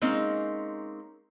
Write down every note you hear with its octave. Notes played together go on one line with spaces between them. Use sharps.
G#3 A#3 C4 C#4 D#4